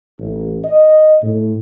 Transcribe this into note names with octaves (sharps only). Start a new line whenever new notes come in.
A1
D#5
A2